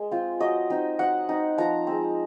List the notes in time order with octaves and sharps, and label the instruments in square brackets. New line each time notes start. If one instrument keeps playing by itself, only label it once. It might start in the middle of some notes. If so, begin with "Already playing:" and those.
Already playing: [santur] G#3
C4 F4
F#3 D#5
C4 D#4
F#3 F#5
C4 D#4
F3 A#5
G#3 C4